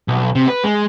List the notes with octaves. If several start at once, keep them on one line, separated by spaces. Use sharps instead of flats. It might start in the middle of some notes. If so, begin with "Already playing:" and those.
B1
C3
B4
G#3